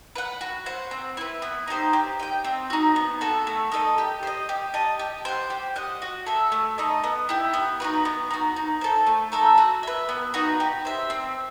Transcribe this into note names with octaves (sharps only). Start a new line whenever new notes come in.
B4 F#5
F#4
C5 F#5
C4
E4 B4
B3
D#4 G4 C5
G4
D#5 G5
C4
D#4 F#4
B3
F#4 A4
A3
D#4 A4 D#5
G4
C5 D#5
G4
D#5 A5
G4
C5 F#5
G4
D#5 F#5
F#4
A4 E5
A3
D#4 A4 D#5
B3
E4 G4
B3
D#4 F#4 B4
B3
D#4 F#4
D#4
A4 C5
A3
D#4 A4 E5
F#4
B4 E5
B3
D#4 F#4 B4
G4
C5 E5
C4